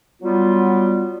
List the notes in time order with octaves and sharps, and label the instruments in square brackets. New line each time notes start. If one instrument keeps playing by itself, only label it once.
[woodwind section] F#3 G3 B3 F4